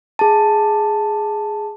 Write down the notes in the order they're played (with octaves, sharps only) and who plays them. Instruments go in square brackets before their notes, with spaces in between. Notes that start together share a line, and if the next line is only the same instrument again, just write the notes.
[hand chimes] G#4 A5